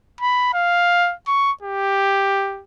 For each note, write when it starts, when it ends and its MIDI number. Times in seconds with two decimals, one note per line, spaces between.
0.21 0.51 83
0.54 1.14 77
1.27 1.51 85
1.62 2.62 67